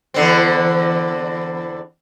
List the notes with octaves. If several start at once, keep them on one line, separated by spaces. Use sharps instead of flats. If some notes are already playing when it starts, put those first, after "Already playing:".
E2 D3 C4